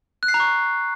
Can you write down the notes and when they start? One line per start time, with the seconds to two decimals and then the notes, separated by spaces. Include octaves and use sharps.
0.23 F#6
0.28 C7
0.34 A#5
0.40 C#6